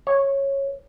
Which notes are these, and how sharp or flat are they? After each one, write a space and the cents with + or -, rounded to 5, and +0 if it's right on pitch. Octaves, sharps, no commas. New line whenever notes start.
C#5 -10